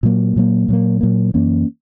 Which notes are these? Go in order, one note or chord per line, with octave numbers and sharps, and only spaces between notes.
A#2 F#3 A#3
A#2 F#3 A#3
A#2 F#3 A#3
A#2 F#3 A#3
F#2 E3 A#3 C#4